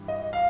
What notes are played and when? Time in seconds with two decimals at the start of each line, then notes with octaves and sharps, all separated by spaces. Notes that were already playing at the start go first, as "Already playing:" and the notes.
Already playing: G2 E3 G3
0.08 D#5
0.33 F5